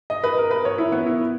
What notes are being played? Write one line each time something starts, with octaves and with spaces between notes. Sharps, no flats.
D#5
B4
A#4
B4
C#5
E4
B3
E4